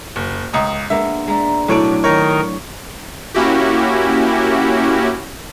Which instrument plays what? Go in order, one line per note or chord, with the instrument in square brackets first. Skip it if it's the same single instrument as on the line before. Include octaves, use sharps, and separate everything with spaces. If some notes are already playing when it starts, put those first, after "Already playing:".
[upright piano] F#1
C#2 A#5 D#6
[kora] G#3 A#3 B3 [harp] D4 [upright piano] E5
[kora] G#3 [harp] D5 A#5 B5
[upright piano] B1 C#5 D7 [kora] A2 D4 [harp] F#3 G5
[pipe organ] D#3 D#4 A#4 [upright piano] C#5
[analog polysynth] A#3 C#4 E4 F#4 G4